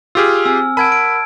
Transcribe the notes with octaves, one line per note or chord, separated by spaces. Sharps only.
F4 G4 G#4 E6 F6
C4 G#5 E6
A#4 F#5 A5 B5 E6 G#6 D7
D7